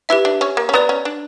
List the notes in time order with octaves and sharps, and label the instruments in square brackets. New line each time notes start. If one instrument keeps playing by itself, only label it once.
[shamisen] E4 [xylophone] G4 B4 E5
[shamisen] D4
C#4
A#3
C#4
[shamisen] B3 [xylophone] B4 D5 A#5
[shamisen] C#4
D4